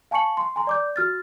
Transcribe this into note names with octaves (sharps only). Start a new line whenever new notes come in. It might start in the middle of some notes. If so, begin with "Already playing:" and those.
F5 G#5 A5 C#6 C#7 F#7
C6
G#5 A#5 C6
D5 D6 G6
F#4 F6 A6